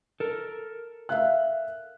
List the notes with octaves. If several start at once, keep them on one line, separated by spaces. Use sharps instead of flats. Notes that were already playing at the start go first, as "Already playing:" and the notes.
A4 A#4
E5 F5 F#6